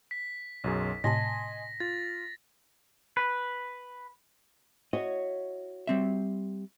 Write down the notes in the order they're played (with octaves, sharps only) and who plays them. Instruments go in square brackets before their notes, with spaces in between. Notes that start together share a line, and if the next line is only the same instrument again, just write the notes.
[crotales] B6
[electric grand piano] B1 F#2 G#4
[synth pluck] A2 C3 A5 [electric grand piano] D#5 G#5 C6 [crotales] A#6
[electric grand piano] F4 [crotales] A6
[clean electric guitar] B4
[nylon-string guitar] E4 F#4 C#5 [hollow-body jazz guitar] D#5
[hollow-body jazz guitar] G3 C4 E5